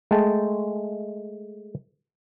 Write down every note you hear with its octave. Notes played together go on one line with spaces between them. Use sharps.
G#3 A3 G5 A5